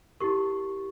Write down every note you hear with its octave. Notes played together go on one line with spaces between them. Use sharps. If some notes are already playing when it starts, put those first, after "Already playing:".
E4 G4 A#4 C#6